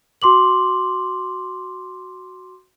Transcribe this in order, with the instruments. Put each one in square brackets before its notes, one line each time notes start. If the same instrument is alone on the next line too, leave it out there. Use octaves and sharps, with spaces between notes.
[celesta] F#4 C6 D6 F#7